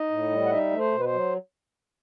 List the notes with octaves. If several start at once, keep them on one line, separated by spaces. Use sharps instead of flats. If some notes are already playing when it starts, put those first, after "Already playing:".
Already playing: D#4 D#5
A2
G3
F#5
D#4 E5
A3
C5
B2
B4
C5
F#3